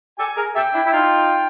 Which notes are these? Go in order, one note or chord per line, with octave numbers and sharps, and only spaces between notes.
G4 A4 G#5
G#4 A#4
G4 A4 E5 G5
D4 E4
E4
D#4 F4